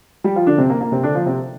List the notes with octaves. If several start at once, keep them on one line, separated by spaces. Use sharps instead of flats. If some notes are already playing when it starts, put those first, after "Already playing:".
G3 G4
F3 F4
D3 D4
C3 C4
A#3
A#3
C3 C4
D3 D4
F3 F4
C3 C4